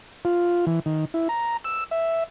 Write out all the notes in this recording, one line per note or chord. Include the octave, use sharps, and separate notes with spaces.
F4
E3
D#3
E4
A#5
E6
E5